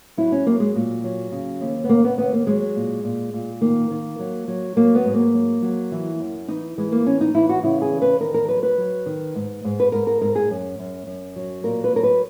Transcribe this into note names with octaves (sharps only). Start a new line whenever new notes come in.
F#3 E4
C#4
F#3 A#3
G#3
A#2
F#3
C#3
D#2
B3
C#3 A#3
B3
D#2 B3
A#3
F#3 G#3
A#2
A#2
A#2
D#3 A#3
D#3
F#3
F#3
F#3 A#3
B3
G#2
A#3
F#3
F#3
E3
F#2
E3 D#4
E3 G#3
A#3
E3 C#4
D#4
E3 E4
F#4
C#3 E4
G#4
E2
B4
D#3 A#4
A#4
F#3 B4
B4
F#3
D#3
G#2
G#2
B4
G#2 A#4
A#4
G#2 A#4
G#4
F#2
F#2
F#2
F#3
A#2 A#4
B4
F#3 A#4
B4